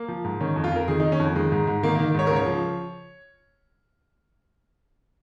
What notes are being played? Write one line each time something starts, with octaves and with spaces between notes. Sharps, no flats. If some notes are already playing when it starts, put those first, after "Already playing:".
Already playing: A#3
F3
G#2
D#3 C#4
F2
F4
F2 A#4
D#3 G#4
D#3 D#4
C#4
F2
D#3 G#3
G#2
G#2
D#3 A#3
D#3 A#3
G#2 C#5
C#2 A#4
C#5
F3